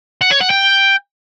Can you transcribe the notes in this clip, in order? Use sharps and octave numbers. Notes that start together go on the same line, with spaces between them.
F#5
C#5
F#5
G5